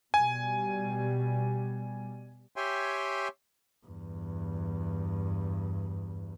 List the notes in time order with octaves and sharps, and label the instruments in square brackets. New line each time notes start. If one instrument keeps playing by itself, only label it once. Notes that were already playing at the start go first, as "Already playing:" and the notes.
[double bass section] B2 G3 [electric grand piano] G#5
[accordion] G4 C#5 E5 G5 G#5 C6
[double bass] E2 G2